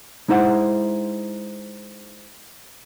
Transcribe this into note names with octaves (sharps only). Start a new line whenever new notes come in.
G#3 D#4 E4 C5 F#5